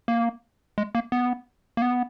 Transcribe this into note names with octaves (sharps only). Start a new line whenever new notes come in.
A#3
G#3
A#3
B3
A#3
B3